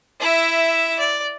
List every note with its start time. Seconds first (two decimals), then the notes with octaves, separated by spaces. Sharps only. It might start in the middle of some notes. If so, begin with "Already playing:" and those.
0.20 E4 E5
0.99 D5